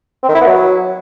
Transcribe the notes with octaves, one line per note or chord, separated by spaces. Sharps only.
C4
D#3
E4
B3
F#3